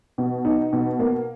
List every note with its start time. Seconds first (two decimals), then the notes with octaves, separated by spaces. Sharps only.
0.18 B2
0.45 D#4
0.73 B2
0.99 A#3